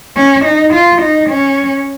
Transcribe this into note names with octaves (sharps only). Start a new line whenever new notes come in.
C#4
D#4
F4
D#4
C#4